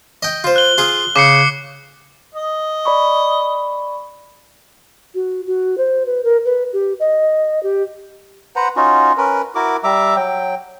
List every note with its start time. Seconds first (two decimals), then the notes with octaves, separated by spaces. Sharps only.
0.23 D#5 G5
0.44 F4 C5
0.56 F#6 G7
0.78 F4 G#4 F5
1.16 C#3 D6 C7 C#7
2.35 D#5
2.85 D5 B5 C#6
5.15 F#4
5.47 F#4
5.78 C5
6.06 B4
6.24 A#4
6.45 B4
6.73 G4
7.00 D#5
7.63 G4
8.56 B4 C5 F#5 A#5
8.76 C#4 D#4 F4 F#4
9.18 C#4 A#4 B4
9.55 E4 F#4 A#4 D6
9.84 G3 E5 A#5 D6
10.16 F#3 G5